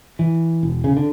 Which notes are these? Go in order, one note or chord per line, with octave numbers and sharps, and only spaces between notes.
E3
E1
C#3
D3